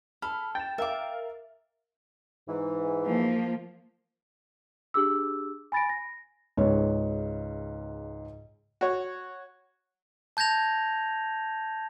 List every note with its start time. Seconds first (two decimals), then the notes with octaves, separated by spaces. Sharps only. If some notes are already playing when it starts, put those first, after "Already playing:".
0.22 A4 B5 F6
0.55 G5 A6 E7
0.78 A#4 E5 F5 D6
2.48 G#2 E3
3.06 F3 A#3
4.94 D4 G4 G#4 D6 E6
5.72 G#5 B5 A6 A#6 D7
5.89 A#6
6.57 C#2 G#2 C#5
8.81 F#4 C#5
10.37 A5 G6 G#6 A#6 F7